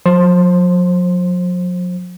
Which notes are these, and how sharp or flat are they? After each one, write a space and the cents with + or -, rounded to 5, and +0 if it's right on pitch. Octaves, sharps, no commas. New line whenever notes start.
F#3 -45 C5 +20 C6 +0